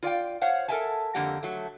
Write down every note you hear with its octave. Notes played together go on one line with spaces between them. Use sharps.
F4 D5 F5 G5
C5 C#5 F5 F#5
A4 A#4 C5 E5 G#5 A5
F2 D3 A#3 G4 F#5
F#3 A3